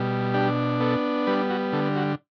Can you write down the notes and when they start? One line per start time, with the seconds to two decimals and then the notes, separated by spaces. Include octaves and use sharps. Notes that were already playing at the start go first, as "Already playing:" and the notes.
Already playing: B2 G3
0.34 D4 G4
0.80 B3 A4
1.27 G3 B4
1.50 F#4
1.73 D3 A4
1.96 F#4